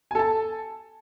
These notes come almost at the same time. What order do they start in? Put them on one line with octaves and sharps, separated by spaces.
G#5 A4 A5